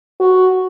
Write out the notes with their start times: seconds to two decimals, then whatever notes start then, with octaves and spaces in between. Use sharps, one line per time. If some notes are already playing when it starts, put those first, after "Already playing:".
0.20 F#4